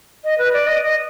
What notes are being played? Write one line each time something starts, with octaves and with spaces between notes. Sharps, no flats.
D#5
B4
D5
D#5
D#5